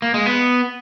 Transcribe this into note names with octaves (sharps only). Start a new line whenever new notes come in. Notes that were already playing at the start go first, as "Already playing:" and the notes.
A#3
G#3
B3